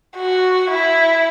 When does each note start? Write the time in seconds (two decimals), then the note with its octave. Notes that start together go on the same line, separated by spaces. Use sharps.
0.17 F#4
0.70 E4